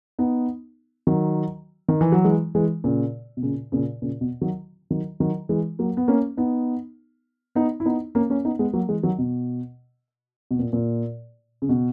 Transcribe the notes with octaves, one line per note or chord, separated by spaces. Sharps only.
B3 D#4
D#3 F#3
D#3
E3
F#3
E3 G#3
E3 G#3
A#2 C#3
B2
A#2 C#3
A#2 C#3
A#2 C#3
B2
D#3 F#3
D#3 F#3
D#3 F#3
E3 G#3
F#3 A#3
B3
A#3 C#4
B3 D#4
B3 D#4
E4
B3 D#4
A#3 C#4
A#3 C#4
B3 D#4
G#3 B3
F#3 A#3
E3 G#3
D#3 F#3
B2
B2
A#2
A#2
C#3
B2